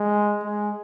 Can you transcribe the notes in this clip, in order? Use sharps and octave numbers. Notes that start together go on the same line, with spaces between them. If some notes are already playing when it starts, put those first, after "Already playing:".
Already playing: G#3
G#3